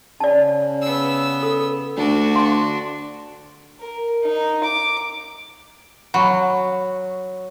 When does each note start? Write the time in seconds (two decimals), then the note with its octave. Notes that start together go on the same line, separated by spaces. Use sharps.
0.20 C#3 D5 A5
0.82 B3 E6
1.43 A4
1.97 D2 D4 F#4
2.35 F5 C6
3.80 A#4
4.23 D#4
4.64 D6
6.14 F#3 B5 C#6